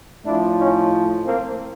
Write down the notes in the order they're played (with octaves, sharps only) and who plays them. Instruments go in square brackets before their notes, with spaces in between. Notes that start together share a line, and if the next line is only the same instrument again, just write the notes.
[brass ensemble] A2 F3 D4 E4
C#4 D#4
A#3 C4